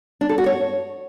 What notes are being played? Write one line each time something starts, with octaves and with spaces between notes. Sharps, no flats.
D4
A4
F#4
C#5